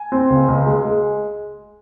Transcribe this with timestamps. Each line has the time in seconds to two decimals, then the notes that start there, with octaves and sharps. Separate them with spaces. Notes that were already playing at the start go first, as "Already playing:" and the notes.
Already playing: G#5
0.12 C4
0.30 C#2
0.48 C#2
0.66 G#3
0.85 G#3